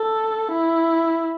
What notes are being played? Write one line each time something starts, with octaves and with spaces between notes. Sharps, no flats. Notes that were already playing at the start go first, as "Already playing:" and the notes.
Already playing: A4
E4